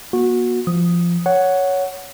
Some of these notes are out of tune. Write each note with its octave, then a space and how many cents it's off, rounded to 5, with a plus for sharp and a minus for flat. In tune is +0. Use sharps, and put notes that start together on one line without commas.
A#3 +45 F#4 -20
F3 -15 D#6 +0
C#5 +10 F#5 +0